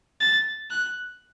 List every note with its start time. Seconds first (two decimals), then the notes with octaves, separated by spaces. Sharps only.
0.20 A6
0.70 F#6